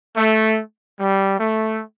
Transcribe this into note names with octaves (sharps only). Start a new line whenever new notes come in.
A3
G3
A3